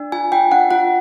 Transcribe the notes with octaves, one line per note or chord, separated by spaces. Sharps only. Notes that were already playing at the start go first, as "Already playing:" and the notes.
Already playing: D4
F4 G#5
F4 G5
D4 F#5
F4 F#5